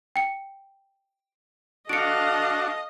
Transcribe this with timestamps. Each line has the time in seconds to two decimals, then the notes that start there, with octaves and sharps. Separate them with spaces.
0.16 G5 C#7
1.89 D4 F#4 A4 D#5 F5 C#7 D7